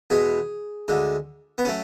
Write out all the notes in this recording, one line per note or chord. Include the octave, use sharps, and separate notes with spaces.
E2 B2 G#3 G#4
D2 D3 G#3
B3
F#3 A3 C#4